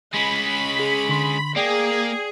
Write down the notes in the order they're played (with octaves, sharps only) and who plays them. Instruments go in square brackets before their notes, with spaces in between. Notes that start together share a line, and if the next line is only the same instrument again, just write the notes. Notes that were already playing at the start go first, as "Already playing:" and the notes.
[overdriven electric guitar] G#3 C#4 [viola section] B5
[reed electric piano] G#4
D3 C6
[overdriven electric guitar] A#3 [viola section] G#4 [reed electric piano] D5 G5